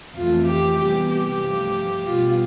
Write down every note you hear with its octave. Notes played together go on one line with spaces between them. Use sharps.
F2 E3 A3 F4
G4
C3 E3 G3 B3 G4
G4
G2 F3 A3
B2 G3 B3 F4